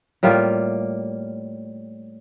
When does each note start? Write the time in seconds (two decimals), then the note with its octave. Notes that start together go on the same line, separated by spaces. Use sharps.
0.23 A2 G3 A#3 F4